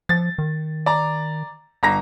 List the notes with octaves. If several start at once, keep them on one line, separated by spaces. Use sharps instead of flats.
F3 A6
D#3
D5 A#5
G1 A#5 A#6